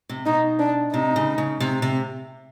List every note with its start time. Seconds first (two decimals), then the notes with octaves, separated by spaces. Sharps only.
0.09 C3
0.26 B2 D#4
0.60 D4
0.93 C3 D#4
1.16 C#3
1.38 C#3
1.60 C3
1.82 C3